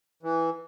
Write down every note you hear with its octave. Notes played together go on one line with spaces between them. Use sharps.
E3